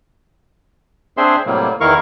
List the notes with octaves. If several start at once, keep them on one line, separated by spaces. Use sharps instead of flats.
C4 D4 G#4 C5 E5 C6
A2 C3 F#3 G3 A#3
E2 D#3 E4 A#4 F5 C#6